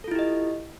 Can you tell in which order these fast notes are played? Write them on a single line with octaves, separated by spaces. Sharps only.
A4 F4 E4 G4 D#5